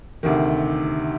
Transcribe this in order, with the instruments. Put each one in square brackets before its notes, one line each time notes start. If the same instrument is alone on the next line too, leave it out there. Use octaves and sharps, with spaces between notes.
[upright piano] D2 C3 D#3